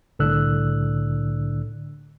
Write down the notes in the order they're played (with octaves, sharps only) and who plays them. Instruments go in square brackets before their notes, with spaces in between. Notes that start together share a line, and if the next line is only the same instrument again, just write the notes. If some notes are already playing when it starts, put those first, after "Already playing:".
[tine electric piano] C2 A2 D3 D4 E6 F#6